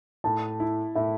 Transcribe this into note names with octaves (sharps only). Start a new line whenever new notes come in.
A2 A5
E4
A2 E5